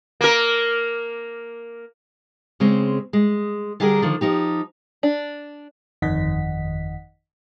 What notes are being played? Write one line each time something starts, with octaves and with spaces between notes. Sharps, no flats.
A#3 A#4
C#3 G#3 C4
G#3
D3 G3 G4 G#4 A#4
D3 D#3 F3
F3 D#4 G4
D4
G1 F2 D#3 D#5 F#5 B6